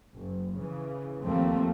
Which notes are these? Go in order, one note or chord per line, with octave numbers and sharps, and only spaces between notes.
F#1
C#3 E3
D#2 F3 A3 A#3 C4